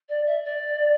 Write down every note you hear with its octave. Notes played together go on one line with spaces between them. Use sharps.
D5
E5
D5